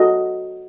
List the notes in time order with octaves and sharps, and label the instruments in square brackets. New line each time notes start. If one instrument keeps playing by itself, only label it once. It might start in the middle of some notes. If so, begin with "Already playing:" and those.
Already playing: [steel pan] F#4 A4 D#5